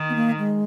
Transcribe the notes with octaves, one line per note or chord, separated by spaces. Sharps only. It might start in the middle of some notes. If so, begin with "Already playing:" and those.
Already playing: D#3
B3
A#3
G#3